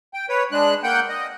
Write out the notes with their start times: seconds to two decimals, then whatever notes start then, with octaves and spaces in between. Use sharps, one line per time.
0.14 G5
0.29 B4 C#5
0.52 G#3 D4 F#6
0.84 A#3 F#5 G5 G6
1.09 D#5